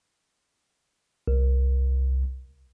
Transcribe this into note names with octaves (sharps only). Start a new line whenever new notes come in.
C2